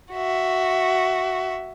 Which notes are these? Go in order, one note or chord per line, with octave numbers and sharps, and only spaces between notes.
F#4 E5